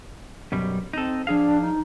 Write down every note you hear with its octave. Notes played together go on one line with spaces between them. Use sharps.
F#2 B2 G3
C4 D#4 A4
F3 D4 G#4 F5
D#4